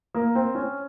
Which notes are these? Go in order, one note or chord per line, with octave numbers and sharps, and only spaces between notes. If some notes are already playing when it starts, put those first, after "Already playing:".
A#3
C4
C#4